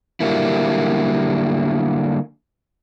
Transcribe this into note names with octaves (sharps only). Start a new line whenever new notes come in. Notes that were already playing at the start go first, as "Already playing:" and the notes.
D3 F#3 G3 A#3 E4